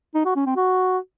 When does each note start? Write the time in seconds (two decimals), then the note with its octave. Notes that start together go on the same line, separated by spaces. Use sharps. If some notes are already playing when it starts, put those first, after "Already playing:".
0.15 D#4
0.25 F#4
0.36 C#4
0.46 C4
0.56 F#4